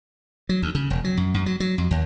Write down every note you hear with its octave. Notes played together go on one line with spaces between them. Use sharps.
F#3
D2
C#3
E1
F#3
F#2
F#2
F#3
F#3
F2
D#2